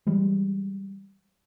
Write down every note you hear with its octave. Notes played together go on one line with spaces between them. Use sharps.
E3 G3 G#3